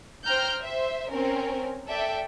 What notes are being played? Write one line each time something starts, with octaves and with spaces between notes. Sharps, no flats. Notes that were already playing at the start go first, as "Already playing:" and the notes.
C5 G5 A#5 F6 G6
C5 E5
C4 C#4 A#4
A4 D5 E5 G5